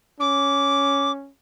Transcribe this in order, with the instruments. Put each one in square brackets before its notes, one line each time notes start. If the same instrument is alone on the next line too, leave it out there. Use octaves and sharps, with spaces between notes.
[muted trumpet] C#4 [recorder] D6